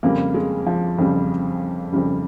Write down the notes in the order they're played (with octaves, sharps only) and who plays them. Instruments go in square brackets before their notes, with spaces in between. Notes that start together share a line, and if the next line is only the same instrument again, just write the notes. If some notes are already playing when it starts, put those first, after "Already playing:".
[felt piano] F2 C#3 G3 [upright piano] A#3
[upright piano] G#3
F3
[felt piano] F2 C#3 G3
F2 C#3 G3